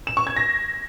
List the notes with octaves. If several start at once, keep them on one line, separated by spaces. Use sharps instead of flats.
E7
C#6
G#6
A#6